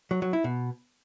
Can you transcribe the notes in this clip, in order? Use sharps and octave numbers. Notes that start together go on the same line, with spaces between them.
F#3
F#3
E4
B2